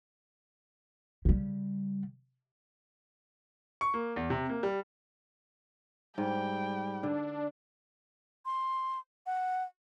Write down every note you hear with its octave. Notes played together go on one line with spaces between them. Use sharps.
C#3 G3
C#6
A#3
E2
C3
A#3
G3
G#2 G3 G5
D3 D4
C6
F#5